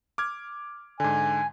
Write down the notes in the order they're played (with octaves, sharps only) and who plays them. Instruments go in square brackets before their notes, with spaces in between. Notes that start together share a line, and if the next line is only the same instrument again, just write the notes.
[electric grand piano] D6 F6 G#6
[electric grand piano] G#2 D3 [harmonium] G#5